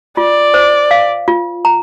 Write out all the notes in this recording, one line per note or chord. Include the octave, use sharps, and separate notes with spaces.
F4 D5
C5
F5
F4
A#5